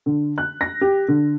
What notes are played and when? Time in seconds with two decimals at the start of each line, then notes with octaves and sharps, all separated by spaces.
0.06 D3
0.38 F#6
0.61 A#6
0.81 G4
1.08 D3